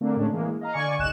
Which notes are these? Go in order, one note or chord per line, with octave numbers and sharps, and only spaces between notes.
D3 A3 A#3 C4 D4
A2 G#3 C#4 D4
E3 G#3 A#3
D#5 F5 A#5
D3 D5 G#5 C#6
G1 C2 D#4 F#6 E7